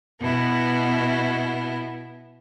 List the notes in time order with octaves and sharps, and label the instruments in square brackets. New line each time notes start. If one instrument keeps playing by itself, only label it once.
[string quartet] B2 B3 E4